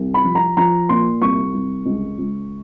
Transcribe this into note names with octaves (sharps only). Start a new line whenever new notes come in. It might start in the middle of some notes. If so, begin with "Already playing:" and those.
Already playing: C2
B5
F3
A#5
F3 A#5
A#2 C6
C2 C#6
C2
C#2
C#2